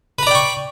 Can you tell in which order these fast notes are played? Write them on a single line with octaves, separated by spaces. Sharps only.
B4 A#5 D5 G5 C#6